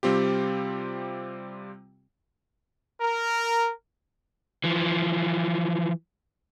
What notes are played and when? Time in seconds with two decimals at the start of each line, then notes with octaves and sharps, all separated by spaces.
0.03 C3 G3 C4 F4 G4
3.01 A#4
4.64 E3 F3